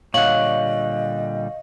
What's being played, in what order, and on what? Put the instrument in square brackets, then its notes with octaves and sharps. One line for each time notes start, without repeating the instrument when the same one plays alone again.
[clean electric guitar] A#2 D3 G3 [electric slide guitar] C#5 F#5 [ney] D#5 [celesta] F5 F#7